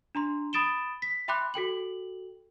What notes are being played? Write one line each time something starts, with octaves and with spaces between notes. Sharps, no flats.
D4 A#5 C6
B5 D#6 A6 D7 E7 G7
B6
E5 G5 B5 C6 D6 F#6
F#4 A4 G5 F#7